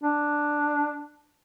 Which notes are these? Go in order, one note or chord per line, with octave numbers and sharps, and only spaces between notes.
D4